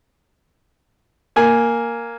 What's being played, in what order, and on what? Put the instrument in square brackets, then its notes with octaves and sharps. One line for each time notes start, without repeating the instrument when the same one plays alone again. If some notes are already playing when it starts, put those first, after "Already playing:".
[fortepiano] A#3 G#5